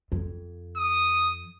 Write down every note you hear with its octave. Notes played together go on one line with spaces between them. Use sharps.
F2
D#6